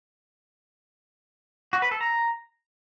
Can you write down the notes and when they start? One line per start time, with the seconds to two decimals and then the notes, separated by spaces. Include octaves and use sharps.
1.73 F#4
1.82 B4
1.91 A4
2.01 A#5